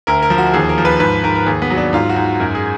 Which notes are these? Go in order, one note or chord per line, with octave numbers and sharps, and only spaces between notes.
D2 A#4
A#4
F3
F#4
D#2 G#4
A#4
F3
B4
G#2 B4
G#2 A#4
A#4
D#2 G#4
B3
F#3
D4
G#2 F4
F#4
G#2
F#2 A#4
G#4